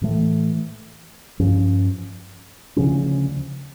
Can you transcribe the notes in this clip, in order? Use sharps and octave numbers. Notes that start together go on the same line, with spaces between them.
A2 E3 A3
G2 F3 C#4
D2 C#3 F3 C#4